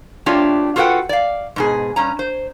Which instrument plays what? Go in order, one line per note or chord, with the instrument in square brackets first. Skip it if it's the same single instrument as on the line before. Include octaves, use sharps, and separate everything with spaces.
[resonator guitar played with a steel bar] A3 C4 D4 F4 G4 C#5
F4 F#4 A4 B4 F#5 G5
D5 F5
G#2 B2 G#4
G2 C#4 A#5
C5